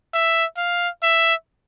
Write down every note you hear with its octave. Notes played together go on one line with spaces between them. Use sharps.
E5
F5
E5